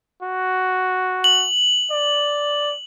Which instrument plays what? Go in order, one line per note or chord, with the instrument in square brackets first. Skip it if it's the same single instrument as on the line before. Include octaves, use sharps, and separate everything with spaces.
[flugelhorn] F#4
[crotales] F#7
[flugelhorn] D5